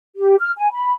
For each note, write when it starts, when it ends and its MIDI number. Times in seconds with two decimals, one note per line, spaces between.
0.17 0.36 67
0.40 0.52 89
0.57 0.69 80
0.73 0.93 83